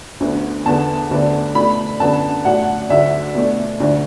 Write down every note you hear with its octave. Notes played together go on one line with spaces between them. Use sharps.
D2 D3 B3
E2 D3 B3 A5
D2 D3 B3 D4
B2 A3 D4 B5
F#2 D3 B3 D4 A5
A2 F#3 D4 F#5
D2 D3 F#3 D4 E5
B2 A3 D4
D2 D3 A3 D4